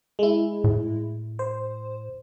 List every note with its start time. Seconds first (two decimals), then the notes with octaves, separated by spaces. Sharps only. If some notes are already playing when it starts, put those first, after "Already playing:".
0.19 G#3 E4
0.64 A2
1.39 C5